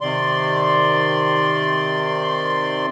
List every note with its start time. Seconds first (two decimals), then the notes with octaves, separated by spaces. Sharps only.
0.01 C3 D#3 D5 C6